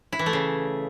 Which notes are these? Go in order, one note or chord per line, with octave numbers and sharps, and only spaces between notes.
E4
E3
A3
C#3